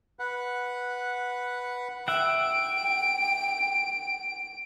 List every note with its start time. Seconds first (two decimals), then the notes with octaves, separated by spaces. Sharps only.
0.19 B4 F#5
2.08 E5 F#5 G5 D7